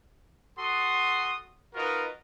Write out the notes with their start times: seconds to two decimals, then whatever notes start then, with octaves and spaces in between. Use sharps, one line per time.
0.58 F#4 A4 F#5 C6 D#6
1.75 D#4 F4 F#4 A#4 B4 D#5